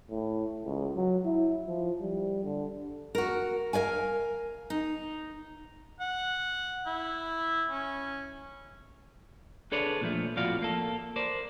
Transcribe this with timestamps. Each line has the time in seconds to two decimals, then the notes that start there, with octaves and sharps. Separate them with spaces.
0.10 A2
0.65 C#2
0.96 F#3
1.25 E4
1.68 F3
2.01 G3
2.44 D3
3.15 F#4 A#4
3.73 A#4 D5 F5 G#5
4.70 D#4
6.00 F#5
6.86 E4
7.71 C#4
9.72 D4 G#4 A4 B4 C#5 D5
10.01 A#2 F3 A3
10.36 F2 A2 F4 F#4 D5 F5
10.62 A#3 A4
11.16 A#4 C5 D5